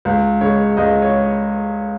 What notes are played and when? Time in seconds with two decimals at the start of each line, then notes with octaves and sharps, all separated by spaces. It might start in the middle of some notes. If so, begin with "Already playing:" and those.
0.05 C#2
0.41 C#3 G#3 C#5
0.77 C#2 D#5
1.02 C#5